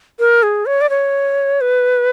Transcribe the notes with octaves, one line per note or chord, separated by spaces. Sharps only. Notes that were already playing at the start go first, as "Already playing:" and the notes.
A#4
G#4
C#5
D5
C#5
B4